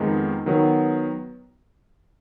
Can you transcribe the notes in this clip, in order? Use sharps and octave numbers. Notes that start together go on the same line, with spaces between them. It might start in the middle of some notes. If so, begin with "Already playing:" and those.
Already playing: F2 D#3 G#3 B3 D#4
D#3 F#3 B3